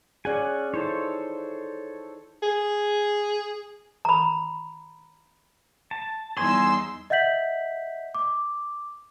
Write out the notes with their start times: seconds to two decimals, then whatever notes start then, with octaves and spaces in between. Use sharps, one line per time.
0.25 C#4 G#4 D5 F#5 G#5
0.74 D#4 E4 A4 C5 C#5
2.42 G#4
4.05 A#5 B5
5.91 A5
6.37 E2 G3 D#4 G#5 C6 E6
7.10 D#5 E5 F#5 G6 B6 F#7
8.15 D6